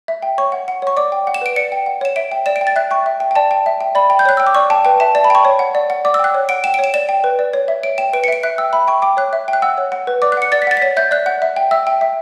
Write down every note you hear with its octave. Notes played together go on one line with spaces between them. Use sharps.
E5
G5
C#5 C#6
F#5
F#5
C#5 C#6
D5 D6
G5
F#5
E7
B4 D7
D5 C#7
G5
F#5
C#5 E7
E5 D7
G5
D5 E7
D7
G5
A6
E5 F#6
G5 C#6
E5
G5
G5
D5 A5
G5
E5
G5
D5 B5
G5
G6
C#5 F#6
G5 E6
D6
D5 C#6
G5 A5
B4 G5
E5 A5
D5 A5
B5
G5 C#6
C#5
F#5
D5
F#5
D5 D6
E6
G5 F#6
C#5
F#5 D7
G5 E7
D7
C#5 E7
D5 E7
G5
B4
D5
C#5
E5
C#5 D7
G5 E7
B4 D7
C#7
E5 D7
E5 F#6
G5 E6
E5 B5
G5 C#6
G5 D6
C#5 F#6
E5
G5
F#6
F#5 E6
C#5
F#5
B4
D5 D6
F#6
F#5 C#7
D5 A6
B6
F#5 A6
B6
C#5 A6
E5 G6
D5 F#6
F#5
E5
G5
E5 E6
G5
E5